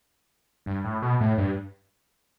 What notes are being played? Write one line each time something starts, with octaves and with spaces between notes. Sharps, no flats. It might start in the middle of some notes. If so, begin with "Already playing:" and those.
G2
A2
B2
A2
G2